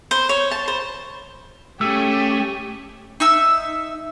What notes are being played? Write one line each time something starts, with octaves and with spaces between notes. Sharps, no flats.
C5
C#5
A5
C5
A3 C#4 G4 G#4 E6
D#4 E5 E6